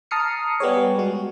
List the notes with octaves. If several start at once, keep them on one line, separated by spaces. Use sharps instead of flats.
A5 A#5 D#6 F6 C7 C#7
G3 B3 G4 G#4 C#5
G#3 F#4